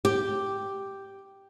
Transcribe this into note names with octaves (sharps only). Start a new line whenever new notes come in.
G4